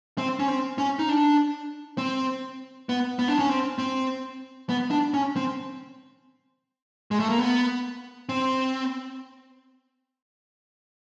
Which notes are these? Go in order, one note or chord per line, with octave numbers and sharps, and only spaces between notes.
C4
C#4
C4
C#4
D#4
D4
C4
B3
B3
D4
C#4
C4
C4
B3
D4
C#4
C4
G#3
A3
A#3
B3
C4